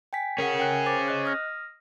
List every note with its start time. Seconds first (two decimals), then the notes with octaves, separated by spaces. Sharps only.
0.13 G5 G#5 B6
0.38 C#4 G#4 A#4 F#5
0.58 A#4 G5 F#6
0.86 C5 D6 A6
1.08 D#5 F#6
1.25 D#6 F6 A#6